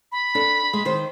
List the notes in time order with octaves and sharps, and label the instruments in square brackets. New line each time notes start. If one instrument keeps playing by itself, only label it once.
[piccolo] B5
[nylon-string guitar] D4 A4
G#3
D#3 C5